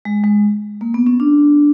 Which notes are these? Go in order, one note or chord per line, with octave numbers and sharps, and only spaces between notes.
G#3
G#3
A#3
B3
C#4
D4